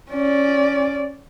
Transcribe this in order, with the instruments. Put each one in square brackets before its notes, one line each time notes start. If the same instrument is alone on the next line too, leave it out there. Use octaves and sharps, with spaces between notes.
[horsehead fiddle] C#4 D5